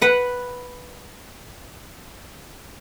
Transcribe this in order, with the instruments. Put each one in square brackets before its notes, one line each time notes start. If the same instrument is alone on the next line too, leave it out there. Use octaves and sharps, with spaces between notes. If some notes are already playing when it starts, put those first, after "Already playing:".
[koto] B4 F#5